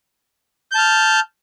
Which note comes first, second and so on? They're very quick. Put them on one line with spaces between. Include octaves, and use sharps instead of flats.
G6 A5 F6